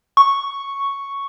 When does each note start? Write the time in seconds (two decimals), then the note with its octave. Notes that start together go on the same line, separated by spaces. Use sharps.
0.17 C#6